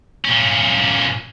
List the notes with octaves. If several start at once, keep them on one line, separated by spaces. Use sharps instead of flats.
A#2 C#4